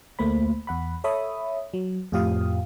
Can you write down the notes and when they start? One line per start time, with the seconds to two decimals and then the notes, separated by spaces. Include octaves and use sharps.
0.19 D2 A3 A#3 C5 B5
0.67 E2 F#5 B5
1.04 A4 C#5 E5 B5 D#6
1.74 F#3
2.12 F2 A2 F4 G4 F5 D#6